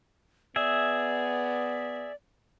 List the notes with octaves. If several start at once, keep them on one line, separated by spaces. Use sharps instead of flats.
B3 G#4 D5 E5